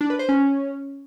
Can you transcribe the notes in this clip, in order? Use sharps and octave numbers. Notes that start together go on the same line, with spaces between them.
D4
B4
C5
C#4